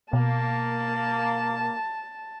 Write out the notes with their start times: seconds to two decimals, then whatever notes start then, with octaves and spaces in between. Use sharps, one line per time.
0.13 B2 A#3 A5